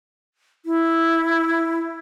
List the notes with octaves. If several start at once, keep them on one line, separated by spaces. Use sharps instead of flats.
E4